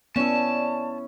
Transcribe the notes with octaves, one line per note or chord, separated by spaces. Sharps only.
B3 C#4 E4 D5 A5